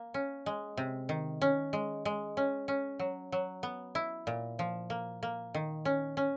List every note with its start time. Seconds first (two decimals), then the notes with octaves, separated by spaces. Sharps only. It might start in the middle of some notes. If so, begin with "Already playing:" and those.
Already playing: A#3
0.14 C#4
0.46 G#3
0.77 C3
1.09 D#3
1.41 C#4
1.73 G#3
2.05 G#3
2.37 C#4
2.68 C#4
2.99 F#3
3.32 F#3
3.63 B3
3.95 E4
4.27 A#2
4.59 F3
4.90 A#3
5.23 A#3
5.54 D#3
5.85 C#4
6.17 C#4